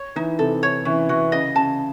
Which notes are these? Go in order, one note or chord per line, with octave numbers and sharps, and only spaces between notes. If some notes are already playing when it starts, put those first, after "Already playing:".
Already playing: C#5
E3 D#4
C3 A4
C#5
E3 C#4
E3 F#4
C#3 D#5
C#3 A5